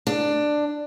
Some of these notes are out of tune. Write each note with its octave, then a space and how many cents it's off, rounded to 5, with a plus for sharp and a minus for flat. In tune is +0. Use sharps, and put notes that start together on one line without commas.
D4 +10